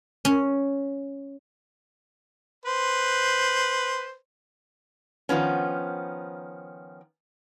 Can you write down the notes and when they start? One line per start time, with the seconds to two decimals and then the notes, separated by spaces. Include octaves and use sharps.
0.25 C#4
2.66 B4 C5
5.29 D#3 F3 B3 C#4